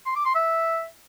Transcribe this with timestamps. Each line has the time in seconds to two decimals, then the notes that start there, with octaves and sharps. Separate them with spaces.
0.06 C6
0.15 D6
0.25 C6
0.35 E5